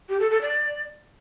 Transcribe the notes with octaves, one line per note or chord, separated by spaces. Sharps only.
G4
A4
A4
D5